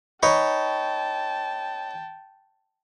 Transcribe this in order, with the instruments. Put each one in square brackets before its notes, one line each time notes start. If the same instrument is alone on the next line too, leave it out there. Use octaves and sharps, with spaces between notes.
[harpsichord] D#4 B4 C#5 [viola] G5 A5